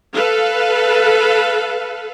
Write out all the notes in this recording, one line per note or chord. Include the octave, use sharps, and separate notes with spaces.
A4 B4 F5